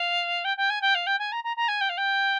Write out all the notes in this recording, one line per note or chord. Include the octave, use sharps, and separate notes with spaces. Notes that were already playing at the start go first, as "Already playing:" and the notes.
Already playing: F5
G5
G5
G#5
G5
F5
G5
G#5
A#5
A#5
A#5
G#5
G5
F5
G5